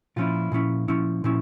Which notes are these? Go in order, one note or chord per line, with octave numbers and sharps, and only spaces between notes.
A#2 F3 C#4 E4 F4
A#2 F3 C#4 E4
A#2 F3 C#4 E4
A#2 F3 C#4 E4